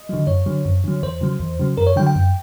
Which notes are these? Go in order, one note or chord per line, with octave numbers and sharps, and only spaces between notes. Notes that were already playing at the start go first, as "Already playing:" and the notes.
Already playing: D#5
D3 F#3
F#2 C#5
D3 F#3
F#2
D3 F#3
E2 C5
C#3 F#3
E2
C#3 F#3
F#2 A#4
C#5
D3 F#3 G5
G5
F#2